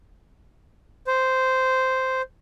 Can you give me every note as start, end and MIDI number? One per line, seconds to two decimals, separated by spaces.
1.07 2.22 72